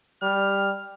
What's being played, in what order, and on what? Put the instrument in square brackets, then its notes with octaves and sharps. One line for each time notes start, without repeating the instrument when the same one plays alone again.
[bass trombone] G3 [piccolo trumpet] F6